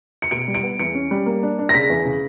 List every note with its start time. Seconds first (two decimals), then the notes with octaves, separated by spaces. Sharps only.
0.22 C#7
0.31 B2 D7
0.48 G3
0.54 D7
0.63 B3
0.80 E2 C#7
0.95 C#4
1.11 G3
1.26 A#3
1.43 D4
1.59 D4
1.69 A#6
1.74 C#3 B6
1.90 E2
2.05 C#3